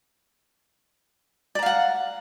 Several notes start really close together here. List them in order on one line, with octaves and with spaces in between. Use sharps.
D5 A#5 F5 F#5